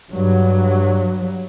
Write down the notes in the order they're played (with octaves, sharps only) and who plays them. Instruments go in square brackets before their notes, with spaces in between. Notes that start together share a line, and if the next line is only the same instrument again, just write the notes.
[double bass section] G2 F#3